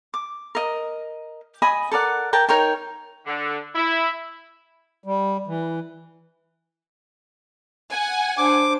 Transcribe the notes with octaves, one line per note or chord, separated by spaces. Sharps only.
D6
A#4 D#5
D#5 G#5 B5 D#6
A4 A#4 D5 F#5
A#4 G5 A5
D#4 A#4 C#5 G5
D3
E4
G3
E3
F#5 G#5
D4 C5 D6